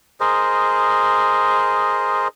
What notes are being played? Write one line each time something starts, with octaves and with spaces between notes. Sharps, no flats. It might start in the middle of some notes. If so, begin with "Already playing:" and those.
G#4 A#4 C5 D#5